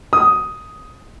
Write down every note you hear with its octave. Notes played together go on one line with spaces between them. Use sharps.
D#6